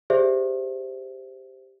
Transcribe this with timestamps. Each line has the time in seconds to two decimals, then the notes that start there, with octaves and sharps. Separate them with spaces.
0.10 G4 G#4 C5 D5 E5